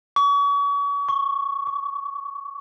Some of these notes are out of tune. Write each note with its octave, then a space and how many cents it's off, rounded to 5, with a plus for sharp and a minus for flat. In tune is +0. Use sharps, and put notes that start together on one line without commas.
C#6 +40
C#6 -10
D6 -45